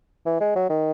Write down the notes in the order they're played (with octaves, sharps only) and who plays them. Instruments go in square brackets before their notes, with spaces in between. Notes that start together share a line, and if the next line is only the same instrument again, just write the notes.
[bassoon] E3
G#3
F#3
D#3